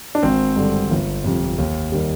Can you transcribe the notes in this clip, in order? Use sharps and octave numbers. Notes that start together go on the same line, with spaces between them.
D4
G#1 C4
G2 D3
G1
F2 C3
D#2
D#3 G3